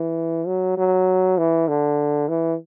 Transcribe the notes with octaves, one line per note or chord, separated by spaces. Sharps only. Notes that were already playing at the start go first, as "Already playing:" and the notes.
Already playing: E3
F#3
F#3
E3
D3
E3